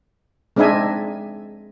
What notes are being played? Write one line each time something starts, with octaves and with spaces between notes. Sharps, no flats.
G#3 C4 D4 D#4 E5 G#5